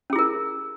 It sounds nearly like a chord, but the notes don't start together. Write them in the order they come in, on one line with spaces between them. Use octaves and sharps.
C#4 G#4 E4 A#4